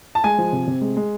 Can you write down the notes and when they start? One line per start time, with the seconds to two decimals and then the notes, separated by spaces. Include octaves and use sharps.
0.15 A5
0.24 G#3 G#5
0.38 F3
0.53 C3
0.68 C3
0.81 G#3
0.97 G#3